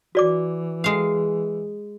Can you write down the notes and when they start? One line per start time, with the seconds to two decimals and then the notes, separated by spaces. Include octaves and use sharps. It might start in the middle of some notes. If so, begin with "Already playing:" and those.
0.15 E3 F#4 D5 D6
0.84 G#3 F5